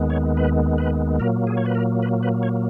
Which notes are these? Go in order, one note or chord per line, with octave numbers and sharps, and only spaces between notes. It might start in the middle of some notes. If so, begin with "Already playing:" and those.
Already playing: D#2 D#3 G#3 B3
C#5
B4
B4
A#2 F#3 A#3 A#4
G#4
C#5
B4
A#4
B4
B4
C#5